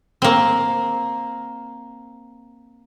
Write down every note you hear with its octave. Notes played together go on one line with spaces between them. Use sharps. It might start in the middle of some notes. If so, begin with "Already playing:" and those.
A#3 C4